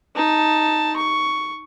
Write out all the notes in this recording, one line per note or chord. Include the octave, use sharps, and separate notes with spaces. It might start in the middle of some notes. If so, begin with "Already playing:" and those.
D#4 A5
C#6